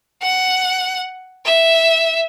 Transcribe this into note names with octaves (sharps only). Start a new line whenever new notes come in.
F#5
E5